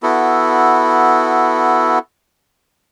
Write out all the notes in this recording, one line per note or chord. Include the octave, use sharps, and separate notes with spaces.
B3 E4 F#4 A4